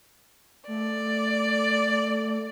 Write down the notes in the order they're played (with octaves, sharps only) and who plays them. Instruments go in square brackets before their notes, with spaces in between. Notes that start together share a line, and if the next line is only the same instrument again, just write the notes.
[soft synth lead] A3 [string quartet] D5